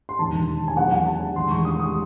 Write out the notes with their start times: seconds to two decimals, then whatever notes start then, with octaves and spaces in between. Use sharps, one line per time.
0.09 C6
0.19 E1 D#2 D#3 A5
0.68 G#5
0.77 E2 C#3 F#3 F#5
0.92 F#5
1.07 A5
1.36 E1 D#2 C#3 E3 G#3 C6
1.51 C#6
1.65 D#6
1.80 D#6